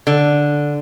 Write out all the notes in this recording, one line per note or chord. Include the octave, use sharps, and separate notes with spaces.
D3